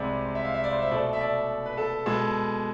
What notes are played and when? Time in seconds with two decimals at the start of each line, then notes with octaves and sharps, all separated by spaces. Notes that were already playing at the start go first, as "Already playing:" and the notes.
Already playing: C2 C3 G#3 D5
0.35 E5
0.44 F5
0.54 E5
0.64 D5
0.73 C5
0.82 E5
0.91 B2 A3 D5
1.13 E5
1.21 D5
1.66 B4
1.77 A4
2.06 B2 G#3 B3 A4